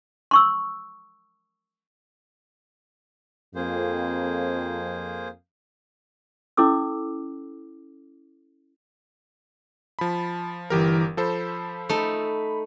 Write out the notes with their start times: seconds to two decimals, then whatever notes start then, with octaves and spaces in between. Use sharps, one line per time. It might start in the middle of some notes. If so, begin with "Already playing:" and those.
0.31 C6 C#6 E6
3.55 F2 A#3 G#4 C5
6.57 C#4 E4 A4 D6 E6
9.99 F3 A5 B5
10.70 G1 E3 G4 A#4
11.17 F3 A4 C5 B5
11.89 A3 D#4